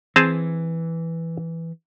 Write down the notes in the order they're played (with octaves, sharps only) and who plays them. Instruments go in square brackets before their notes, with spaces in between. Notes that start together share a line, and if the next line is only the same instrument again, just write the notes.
[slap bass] E3 [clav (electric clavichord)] C4 G#4 A5